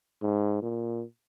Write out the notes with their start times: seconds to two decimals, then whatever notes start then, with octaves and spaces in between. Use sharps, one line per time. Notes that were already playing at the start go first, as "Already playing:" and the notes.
0.22 G#2
0.62 A#2